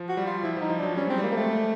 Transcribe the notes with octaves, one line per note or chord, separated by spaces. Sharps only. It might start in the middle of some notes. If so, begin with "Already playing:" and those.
Already playing: F3
F#4
G3
F4
F3 E4
F3
D#4
F3
F#3 D4
G3 C#4
G#3 C4
G3 A#3
A#3
A3